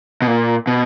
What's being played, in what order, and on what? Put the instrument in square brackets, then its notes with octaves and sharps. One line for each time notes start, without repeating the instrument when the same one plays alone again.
[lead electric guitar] B2
A#2
B2